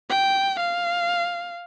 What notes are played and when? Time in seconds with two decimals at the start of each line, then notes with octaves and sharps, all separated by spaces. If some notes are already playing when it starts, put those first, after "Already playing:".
0.10 G5
0.60 F5